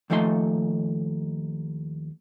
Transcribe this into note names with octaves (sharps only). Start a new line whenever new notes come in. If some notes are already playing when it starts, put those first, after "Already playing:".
D#2 F3 A3 D#4 E5 C6